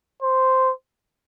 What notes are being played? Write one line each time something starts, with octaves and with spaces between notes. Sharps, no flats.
C5